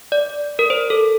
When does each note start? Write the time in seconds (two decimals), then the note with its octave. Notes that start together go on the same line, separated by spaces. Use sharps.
0.12 D5
0.59 A#4
0.70 C5
0.90 A4